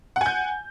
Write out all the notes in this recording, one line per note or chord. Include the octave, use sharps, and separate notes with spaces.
F#5 G#5 G6